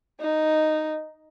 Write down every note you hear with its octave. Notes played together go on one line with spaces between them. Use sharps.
D#4